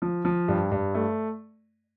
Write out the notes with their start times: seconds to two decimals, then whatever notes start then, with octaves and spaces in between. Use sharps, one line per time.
0.02 F3
0.25 F3
0.48 G2
0.71 G2
0.95 A3